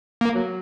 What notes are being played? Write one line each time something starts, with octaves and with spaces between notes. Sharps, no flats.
A#3
F#3